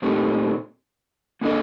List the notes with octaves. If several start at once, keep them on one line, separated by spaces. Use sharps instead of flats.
A#2 A3 C4 D#4 G4
A#3 D4 A4 D#5